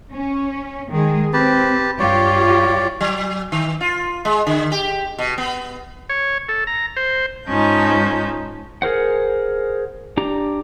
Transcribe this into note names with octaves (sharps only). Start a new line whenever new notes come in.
C#4
D#3 G#3 G#4
C4 G4 B4 A5
G2 F4 G4 C#5 D5
F#3
D#3
F4
G#3
D3
G4
B2
B3
C#5
A4
A#5
C5
G#2 C#4 D#4 F4 A5 G6
G#4 A#4 C5 F#5
D4 G4 A#5